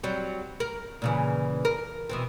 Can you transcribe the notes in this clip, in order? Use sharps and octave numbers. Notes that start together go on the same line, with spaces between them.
F#3 G3 C4
A#4
A#2 C#3 E3
A#4
B2 E3 C4